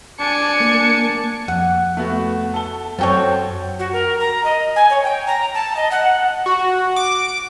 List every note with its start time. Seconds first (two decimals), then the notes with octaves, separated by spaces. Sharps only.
0.20 D4 G#5 C#7
0.60 A#3
1.48 F2 F#5
1.97 A3 B3 F#4
2.54 A4 A5 G7
2.99 F#2 C4 F#4 A4 C#5 G5 A5
3.79 F#4
3.93 A#4
4.20 A#5
4.44 D#5
4.76 G#5
4.90 C#5
5.04 G5
5.27 A#5
5.54 A5
5.77 D#5
5.91 F#5
6.46 F#4
6.96 D6